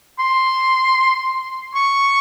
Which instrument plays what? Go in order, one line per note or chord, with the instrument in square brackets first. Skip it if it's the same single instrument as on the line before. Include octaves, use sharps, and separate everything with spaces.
[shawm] C6
C#6